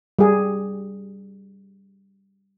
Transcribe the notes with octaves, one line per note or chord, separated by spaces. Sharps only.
G3 G#4